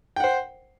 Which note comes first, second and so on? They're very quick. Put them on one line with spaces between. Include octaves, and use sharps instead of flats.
G5 F#5 C5